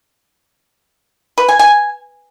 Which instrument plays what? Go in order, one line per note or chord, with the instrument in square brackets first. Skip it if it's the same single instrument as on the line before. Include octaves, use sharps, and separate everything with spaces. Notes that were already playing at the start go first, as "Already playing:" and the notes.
[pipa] B4
G#5
G#5